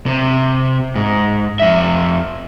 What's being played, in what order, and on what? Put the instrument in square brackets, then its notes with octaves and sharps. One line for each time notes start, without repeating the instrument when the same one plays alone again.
[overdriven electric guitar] C3
G#2
F2 E5